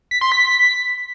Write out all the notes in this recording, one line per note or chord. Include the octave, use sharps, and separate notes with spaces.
B6
C6
B6